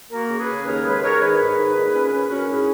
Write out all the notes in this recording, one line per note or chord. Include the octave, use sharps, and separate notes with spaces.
A#3 F#4 A#4
C#3
G#4 B4
C#3
D#2 A#4 C#5
G#3 G#4 B4
G#3 A#4 C#5
D#3 G#4 B4
G#2
D#3
A#2
C#4
C#4
C#4 F#4 A#4
G#2 E4 G#4